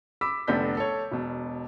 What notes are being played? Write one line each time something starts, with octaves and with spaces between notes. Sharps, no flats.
B5 D6 E6 B6
F1 D3 B3 D4 G6 B6
A4 C#5
E1 B2